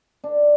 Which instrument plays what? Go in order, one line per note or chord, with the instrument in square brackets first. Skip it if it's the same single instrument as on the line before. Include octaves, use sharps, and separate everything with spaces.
[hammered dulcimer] D4